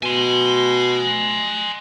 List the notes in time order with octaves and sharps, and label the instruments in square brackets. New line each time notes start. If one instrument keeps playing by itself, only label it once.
[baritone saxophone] B2 [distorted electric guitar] G#5 C6